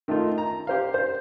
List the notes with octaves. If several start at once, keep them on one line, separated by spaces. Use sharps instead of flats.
D#3 A3 D#4 F4
A#5
G4 C5 F5
C5